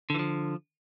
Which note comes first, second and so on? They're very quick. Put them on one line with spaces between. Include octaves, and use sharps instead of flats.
D3 E3 F3